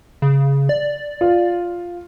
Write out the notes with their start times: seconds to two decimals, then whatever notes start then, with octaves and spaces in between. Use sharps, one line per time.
0.22 C#3
0.69 D5
1.21 F4